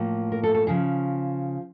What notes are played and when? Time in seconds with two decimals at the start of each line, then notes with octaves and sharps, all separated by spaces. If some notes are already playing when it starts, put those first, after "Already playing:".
Already playing: A2 F3 A#3
0.32 A#4
0.43 A4
0.55 A4
0.67 C#3 F3 G#4